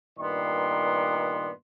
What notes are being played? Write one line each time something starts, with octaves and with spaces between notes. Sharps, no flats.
G2 A#2 D#3 B3 D5 C6